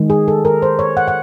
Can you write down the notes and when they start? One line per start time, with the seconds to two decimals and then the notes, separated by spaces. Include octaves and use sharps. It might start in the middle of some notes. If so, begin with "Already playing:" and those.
Already playing: D#3 G#3
0.10 G#4
0.28 A4
0.45 A#4
0.62 C5
0.79 C#5
0.97 F#5
1.08 F#5